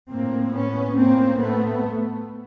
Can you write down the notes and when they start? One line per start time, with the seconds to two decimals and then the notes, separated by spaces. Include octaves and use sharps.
0.11 A2 A#3 C4
0.54 B3 C#4
0.98 A2 A#3 C4
1.41 A3 B3